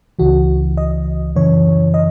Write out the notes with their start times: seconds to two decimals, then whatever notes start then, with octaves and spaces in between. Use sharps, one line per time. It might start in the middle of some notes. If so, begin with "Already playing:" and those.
0.19 C#2 C#3 E3 F#4
0.77 D#5
1.36 F#2 C#3 E3 C#5
1.94 D#5